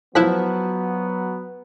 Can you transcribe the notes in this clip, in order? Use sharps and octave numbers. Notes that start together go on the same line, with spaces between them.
F3 F#3 B3 E4 F#6 B6